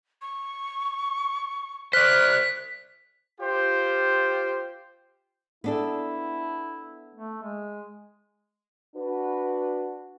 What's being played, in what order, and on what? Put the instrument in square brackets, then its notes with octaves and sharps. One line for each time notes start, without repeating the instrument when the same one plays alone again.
[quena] C#6
[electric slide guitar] C5 D5 [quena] F6 [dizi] F#6 [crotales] B6
[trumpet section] F4 G4 C5
[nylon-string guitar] B3 D4 A4 [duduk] E4
[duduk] A3
G#3
[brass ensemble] D4 F#4 B4